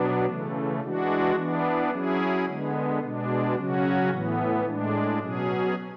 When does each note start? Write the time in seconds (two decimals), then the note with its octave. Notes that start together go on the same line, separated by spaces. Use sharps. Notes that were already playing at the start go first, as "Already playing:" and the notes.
Already playing: B2 F#3 B3 D4
0.25 C#3 E3 A3
0.80 E3 G#3 D4 F#4
1.36 E3 B3 D4
1.90 F#3 C#4 E4 G#4
2.45 D3 G#3 B3
3.01 B2 G#3 D4
3.55 C#3 F#3 C#4 F#4
4.10 A2 E3 B3
4.65 A2 G#3 D4
5.20 B2 F#3 C#4 G#4